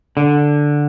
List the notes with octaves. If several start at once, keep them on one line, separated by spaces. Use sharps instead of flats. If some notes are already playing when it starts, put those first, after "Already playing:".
D3